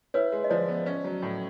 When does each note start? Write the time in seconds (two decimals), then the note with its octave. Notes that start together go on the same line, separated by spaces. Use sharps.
0.14 E4 B4 C#5
0.32 G#3
0.44 D#5
0.50 F3 C5 D5
0.68 B3
0.86 C#4
1.05 F#3
1.22 A2